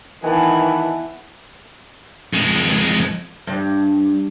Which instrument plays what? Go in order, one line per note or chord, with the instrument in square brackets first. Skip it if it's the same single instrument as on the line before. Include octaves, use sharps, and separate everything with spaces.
[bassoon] D#3 [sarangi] E3 [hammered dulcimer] B3 B4 [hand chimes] G#5 A5
[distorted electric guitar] F2 G#3
[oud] G2